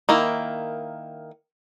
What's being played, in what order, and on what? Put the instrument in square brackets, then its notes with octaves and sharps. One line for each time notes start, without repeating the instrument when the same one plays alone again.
[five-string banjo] D#3 A#3 E4